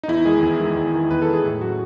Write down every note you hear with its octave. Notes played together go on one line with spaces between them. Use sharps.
D#4
E2 E4
D#3 G#3 G#4
E2
D#3 G#3
E2
D#3 G#3
E2 B4
A4
D#3 G#3 G#4
A2
F#3 A3 C#4 F#4